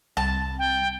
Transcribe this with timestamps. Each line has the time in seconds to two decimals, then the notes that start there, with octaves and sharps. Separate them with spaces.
0.17 C2 A5
0.59 G5